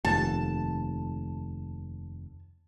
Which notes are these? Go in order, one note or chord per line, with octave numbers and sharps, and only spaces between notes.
F1 D#2 A5